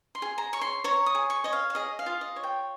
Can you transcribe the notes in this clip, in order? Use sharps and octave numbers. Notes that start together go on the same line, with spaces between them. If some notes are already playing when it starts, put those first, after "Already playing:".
C6
G#4
A#5
C#5 C#6
C6
C#5 A#5
D#6
G#4
C#6
C#5 D#5
F5
F5
G#4 D#5
F5
F4
D#5
C#5
G5